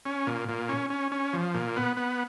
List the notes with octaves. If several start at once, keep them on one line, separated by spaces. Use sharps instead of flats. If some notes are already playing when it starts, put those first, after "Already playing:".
C#4
A#2
A#2
C#4
C#4
C#4
F3
A#2
B3
B3